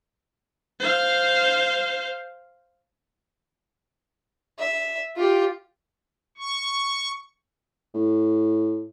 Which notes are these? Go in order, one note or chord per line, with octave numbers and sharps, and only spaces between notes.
C5 F5
E5
F4 G4
C#6
A2